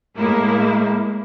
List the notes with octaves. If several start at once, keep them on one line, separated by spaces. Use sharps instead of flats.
A2 G#3 A#3 E4